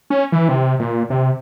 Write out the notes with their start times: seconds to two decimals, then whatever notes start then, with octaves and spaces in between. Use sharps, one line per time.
0.10 C#4
0.32 E3
0.49 C3
0.79 A#2
1.10 C3